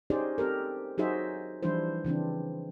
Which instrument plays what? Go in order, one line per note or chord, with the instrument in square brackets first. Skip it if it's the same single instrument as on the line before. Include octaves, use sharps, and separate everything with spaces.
[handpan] C#4 D#4 G4 G#4 C5 D5
C4 G4 A4 A#4
F#3 D#4 F#4 G#4 C5 E5
E3 F3 G3 D4 E4 C5
C#3 E3 C4 D4